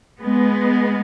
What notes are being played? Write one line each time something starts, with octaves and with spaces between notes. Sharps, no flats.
G#3 B3